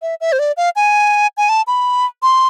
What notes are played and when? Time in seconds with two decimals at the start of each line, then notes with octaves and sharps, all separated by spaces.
0.02 E5
0.21 E5
0.32 C5
0.39 D5
0.57 F5
0.76 G#5
1.37 G#5
1.49 A5
1.67 B5
2.23 C6